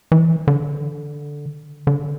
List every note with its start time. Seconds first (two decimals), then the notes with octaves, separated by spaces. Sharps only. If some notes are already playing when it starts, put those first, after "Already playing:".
0.12 E3
0.48 D3
1.87 D3